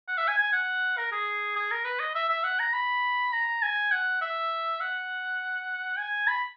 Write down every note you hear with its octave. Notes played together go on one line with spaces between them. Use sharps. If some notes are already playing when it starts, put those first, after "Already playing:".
F#5
E5
G#5
G#5
F#5
A#4
G#4
G#4
A#4
B4
D#5
E5
E5
F#5
A#5
B5
A#5
G#5
F#5
E5
F#5
G#5
B5